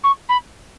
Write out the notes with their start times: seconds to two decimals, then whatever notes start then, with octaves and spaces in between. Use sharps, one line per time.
0.03 C#6
0.29 B5